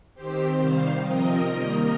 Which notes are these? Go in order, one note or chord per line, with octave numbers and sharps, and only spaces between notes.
D#3 C4 G4 C5
C3 D#3 G3 C5 F5
C3 F3 C4 A#4 D#5
D#3 G3 A#3